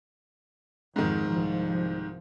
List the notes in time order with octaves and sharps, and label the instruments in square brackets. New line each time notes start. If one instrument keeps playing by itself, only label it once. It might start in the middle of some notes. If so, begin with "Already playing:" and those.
[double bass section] F2 [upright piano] G#2 D#3
[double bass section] C2 F3